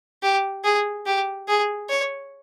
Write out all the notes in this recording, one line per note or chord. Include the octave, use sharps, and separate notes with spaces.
G4
G#4
G4
G#4
C#5